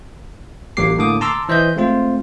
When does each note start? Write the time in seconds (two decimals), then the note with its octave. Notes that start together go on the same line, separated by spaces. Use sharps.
0.77 A1 F#3 A#3 G4 D6 C7
0.98 A2 D3 A#3 D6 D#6
1.21 A5 A#5 C6 D6 E6
1.49 E3 C5 D#5 E5 G6
1.76 G#3 A3 C4 F4 C5